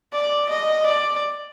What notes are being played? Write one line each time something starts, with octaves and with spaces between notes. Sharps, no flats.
D5
D#5
D5